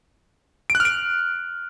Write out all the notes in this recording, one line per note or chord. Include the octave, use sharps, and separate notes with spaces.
D7
F#6
F6
D7